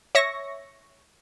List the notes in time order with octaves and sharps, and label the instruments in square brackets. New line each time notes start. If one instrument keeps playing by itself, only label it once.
[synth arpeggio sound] C#5 E5 C#6 A#6